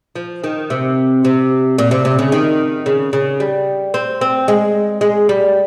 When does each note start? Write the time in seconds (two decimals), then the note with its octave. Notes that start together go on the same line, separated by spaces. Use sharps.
0.16 F3
0.44 D#3
0.70 C3
1.25 C3
1.78 A#2
1.91 C3
2.05 C3
2.19 C#3
2.32 D#3
2.86 C#3
3.13 C#3
3.40 G3
3.94 C4
4.21 C4
4.48 G#3
5.01 G#3
5.29 G3